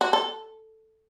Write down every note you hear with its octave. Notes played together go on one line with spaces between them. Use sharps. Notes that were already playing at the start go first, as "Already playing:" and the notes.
F#4
A4